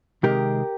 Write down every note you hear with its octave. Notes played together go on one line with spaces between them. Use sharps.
C3 D#3 G#3 G4 A#4